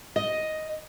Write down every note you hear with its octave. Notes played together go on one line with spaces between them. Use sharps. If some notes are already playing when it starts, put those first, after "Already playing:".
D#5